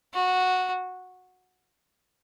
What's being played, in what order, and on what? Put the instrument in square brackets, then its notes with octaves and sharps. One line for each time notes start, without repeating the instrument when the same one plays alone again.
[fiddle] F#4